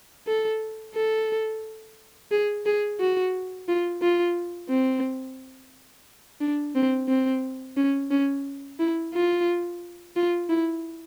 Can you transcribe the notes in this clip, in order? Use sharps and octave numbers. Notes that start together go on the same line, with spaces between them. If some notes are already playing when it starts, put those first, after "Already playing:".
A4
A4
G#4
G#4
F#4
F4
F4
C4
D4
C4
C4
C#4
C#4
E4
F4
F4
E4